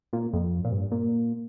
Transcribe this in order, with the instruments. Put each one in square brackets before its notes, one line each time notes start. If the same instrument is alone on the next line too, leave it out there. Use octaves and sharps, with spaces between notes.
[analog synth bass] A#2
F2
A#2
G2
A#2